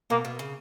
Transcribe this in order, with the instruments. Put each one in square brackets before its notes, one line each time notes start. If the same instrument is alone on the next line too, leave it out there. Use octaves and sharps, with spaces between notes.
[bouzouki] B2 [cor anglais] A#3
[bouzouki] B2
C#3